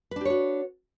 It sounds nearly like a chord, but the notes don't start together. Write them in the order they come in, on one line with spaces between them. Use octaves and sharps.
B4 D4 G4 C#5 F#4